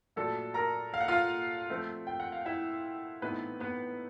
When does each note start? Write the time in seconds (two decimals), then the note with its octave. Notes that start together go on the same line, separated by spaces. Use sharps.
0.16 A#2 F#3 A3 D4 A4 A5
0.54 A#4 A#5
0.94 F5
1.01 F#5
1.08 F4 F5
1.70 F3 A3 C4
2.07 G5
2.20 F#5
2.32 F5
2.46 E4 E5
3.22 A2 E3 A3 B3 C4 D#4 B4
3.60 B3 B4